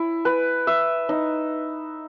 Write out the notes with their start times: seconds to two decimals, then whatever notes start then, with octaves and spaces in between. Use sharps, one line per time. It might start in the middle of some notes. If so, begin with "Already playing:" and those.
Already playing: E4
0.25 B4
0.67 E5
1.09 D#4